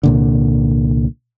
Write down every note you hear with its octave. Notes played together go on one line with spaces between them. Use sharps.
C2 A#2 D3